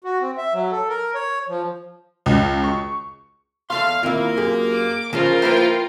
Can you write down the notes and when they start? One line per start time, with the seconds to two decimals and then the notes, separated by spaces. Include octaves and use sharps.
0.04 F#4
0.21 C4
0.38 E5
0.54 F#3
0.72 A4
0.89 A#4
1.15 C#5
1.48 F3
2.26 C#2
2.64 C#6
3.70 E2 A3 F5 C6
4.03 D#2 A#3 C4 E4 F4
4.37 F#2 G4 G#4
4.72 D6
5.13 C#3 F3 G#3 C#4 F4 A#4
5.42 A#3 E4 B4 C5 G5